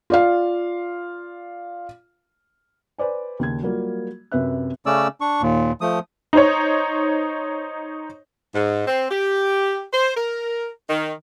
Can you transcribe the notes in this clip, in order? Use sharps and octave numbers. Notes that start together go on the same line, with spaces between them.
F4 D5 F5
B4 C5 D5 G#5
D#2 C#3 G#6
F#3 G3 A#3 F4
F#2 C3 B4 E5 F#6
C#3 A3 C#4 D5 E6
D4 C#6
D#2 A#2
F3 A3 D#6
D#4 C5 C#5
G#2
C4
G4
C5
A#4
D#3